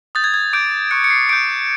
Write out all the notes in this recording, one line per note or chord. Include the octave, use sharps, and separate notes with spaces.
D#6 G6 A6
G#6
G#6
D6 G6 D7
C#6 F#6 C#7
C#7
C7
D6 G6 D7